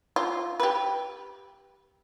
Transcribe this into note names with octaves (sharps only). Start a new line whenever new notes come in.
F4
G4 B4